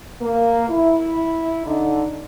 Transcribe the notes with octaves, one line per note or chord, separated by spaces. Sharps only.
A#3
E4
D3 D#4